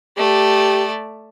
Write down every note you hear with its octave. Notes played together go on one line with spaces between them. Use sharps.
A3 G4 D5